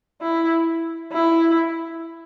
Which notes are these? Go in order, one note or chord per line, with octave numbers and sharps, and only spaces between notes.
E4
E4